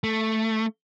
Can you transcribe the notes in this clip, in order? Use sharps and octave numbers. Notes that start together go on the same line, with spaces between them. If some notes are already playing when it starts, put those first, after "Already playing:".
A3